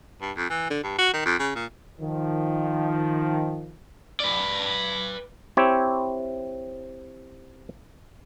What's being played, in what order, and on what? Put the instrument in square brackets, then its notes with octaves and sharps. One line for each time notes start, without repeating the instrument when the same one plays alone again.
[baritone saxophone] G2
F2
E3
D3
G2
F#4
D#3
F2
C#3
A#2
[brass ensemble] D#3 F3
[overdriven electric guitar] B4 D5
[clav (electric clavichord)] C4 E4 G4 C#5